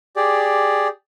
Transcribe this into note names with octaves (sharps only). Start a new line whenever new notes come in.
G4 G#4 D5